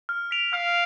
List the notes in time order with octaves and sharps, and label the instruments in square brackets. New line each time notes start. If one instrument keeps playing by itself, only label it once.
[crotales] F6
B6 D7 F7
[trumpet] F5 [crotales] F6